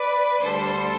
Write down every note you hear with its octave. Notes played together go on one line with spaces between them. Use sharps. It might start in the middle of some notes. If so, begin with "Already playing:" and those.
Already playing: B4 D5
D2 D3 G3 A4 C5